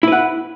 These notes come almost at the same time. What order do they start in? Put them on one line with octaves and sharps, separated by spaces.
E4 B4 F#5